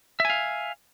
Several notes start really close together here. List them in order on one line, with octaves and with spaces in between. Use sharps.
E5 G#5 F5